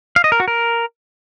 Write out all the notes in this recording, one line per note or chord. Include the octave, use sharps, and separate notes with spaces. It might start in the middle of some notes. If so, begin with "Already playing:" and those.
F5
D#5
A#4
F#4
A#4